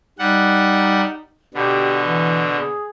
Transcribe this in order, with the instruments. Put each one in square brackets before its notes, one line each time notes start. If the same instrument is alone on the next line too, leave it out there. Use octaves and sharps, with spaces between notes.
[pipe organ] G3 F#5 [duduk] D#4
[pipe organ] B2 D3 [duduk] G4
[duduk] E3
G#4